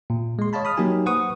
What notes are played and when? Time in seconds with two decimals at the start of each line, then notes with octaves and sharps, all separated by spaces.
0.10 A#2
0.39 G#3 C6
0.53 C#5 D#5 F5 A5 B5
0.65 B5 D#6 F6
0.77 F#3 A#3 D#4 G4 G#5
1.06 B4 C5 F#5 C#6 D#6